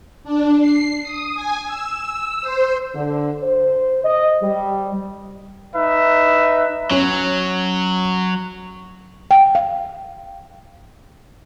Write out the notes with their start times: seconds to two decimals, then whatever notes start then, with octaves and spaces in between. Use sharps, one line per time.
0.24 D4
0.60 C7
1.03 D#6
1.34 G#5
1.65 E6
2.03 E6
2.41 C5
2.95 D3
3.43 C5
4.04 D#5
4.43 G3
5.76 D#4 B4 E5
6.90 F#3 C#4
9.31 G5
9.55 F5